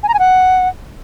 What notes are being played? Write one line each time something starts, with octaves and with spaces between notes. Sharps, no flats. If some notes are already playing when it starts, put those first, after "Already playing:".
G#5
A#5
G#5
F#5